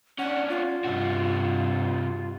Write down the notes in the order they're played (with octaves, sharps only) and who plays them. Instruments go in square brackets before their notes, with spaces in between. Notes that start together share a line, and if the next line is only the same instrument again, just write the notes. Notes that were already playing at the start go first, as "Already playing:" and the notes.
[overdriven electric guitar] C#4 D4 [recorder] F#5
[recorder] F4
[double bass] G2 [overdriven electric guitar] C3 F#4